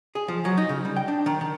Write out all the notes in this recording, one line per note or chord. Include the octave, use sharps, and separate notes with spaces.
G#4
F3
F#3
D#4
C#3
G3
G5
D4
D#3
D#3